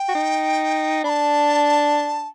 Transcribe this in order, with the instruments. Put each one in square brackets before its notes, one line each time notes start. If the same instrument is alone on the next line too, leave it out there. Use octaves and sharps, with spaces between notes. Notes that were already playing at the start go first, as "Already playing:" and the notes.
Already playing: [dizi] G5
[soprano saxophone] F#4
D#4
[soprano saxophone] D4 [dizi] B5
[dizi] A5